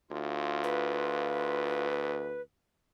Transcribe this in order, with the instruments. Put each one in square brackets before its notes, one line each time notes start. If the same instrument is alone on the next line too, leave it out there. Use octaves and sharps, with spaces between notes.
[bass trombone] D2 [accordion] F4
[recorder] B4